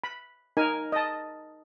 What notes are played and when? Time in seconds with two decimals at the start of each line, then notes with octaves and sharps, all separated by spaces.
0.04 B5
0.57 D#4 A#4 G#5
0.92 D#5 A5